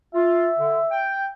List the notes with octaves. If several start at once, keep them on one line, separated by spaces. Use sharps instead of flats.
F4 E5
D3
G5